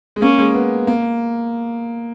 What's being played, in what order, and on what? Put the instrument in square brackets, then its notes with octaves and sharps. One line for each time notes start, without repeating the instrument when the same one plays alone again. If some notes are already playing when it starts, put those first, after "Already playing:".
[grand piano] G#3
[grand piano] A#3 [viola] C#4
[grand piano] G#3
B3
A#3